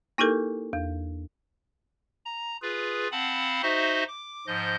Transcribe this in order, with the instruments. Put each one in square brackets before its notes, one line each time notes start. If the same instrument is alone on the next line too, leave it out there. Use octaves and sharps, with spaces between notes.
[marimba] A#3 D#4 E4 G4 A4 A#4
E2
[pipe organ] A#5
F4 G#4 B4
C4 F5 F#5 A5 B5
D#4 F#4 C5 D#5 E5
D6
G#2 F3 D#5 G6